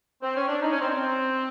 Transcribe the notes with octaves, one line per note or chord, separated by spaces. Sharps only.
C4
C#4
D4
D#4
C#4
C4
C4